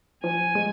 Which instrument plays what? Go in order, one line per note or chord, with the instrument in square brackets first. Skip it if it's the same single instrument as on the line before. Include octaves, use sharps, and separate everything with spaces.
[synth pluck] F3 [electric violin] G#5
[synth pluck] G#3